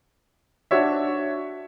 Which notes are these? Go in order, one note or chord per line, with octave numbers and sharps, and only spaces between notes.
D4 F#4 C#5 E5